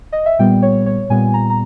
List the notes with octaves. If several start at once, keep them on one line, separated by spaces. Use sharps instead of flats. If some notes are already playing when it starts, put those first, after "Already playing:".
D#5
E5
A#2 G3 B3 G5
C#5
C#5
A#2 G3 B3 G#5
A#5
A#5